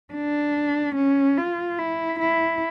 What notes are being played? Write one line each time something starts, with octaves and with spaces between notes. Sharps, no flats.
D4
C#4
F4
E4
E4